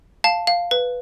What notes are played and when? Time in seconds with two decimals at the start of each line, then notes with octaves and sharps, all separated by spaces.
0.24 F5 A5
0.47 F5
0.71 B4